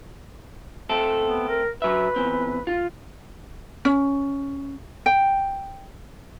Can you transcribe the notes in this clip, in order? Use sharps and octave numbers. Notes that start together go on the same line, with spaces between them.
A3 C4 A4
B3
A#4
F#3 B4 E5
E2 C4
F4
C#4
G5